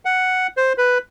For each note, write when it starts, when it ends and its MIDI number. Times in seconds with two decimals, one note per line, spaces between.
0.05 0.47 78
0.57 0.73 72
0.78 0.98 71